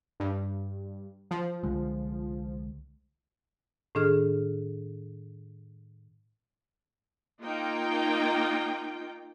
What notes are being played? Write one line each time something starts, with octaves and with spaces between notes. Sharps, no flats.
G2
F3
C2 D3 G#3
A2 D#3 D4 G#4 F6
A#3 D#4 F4 G5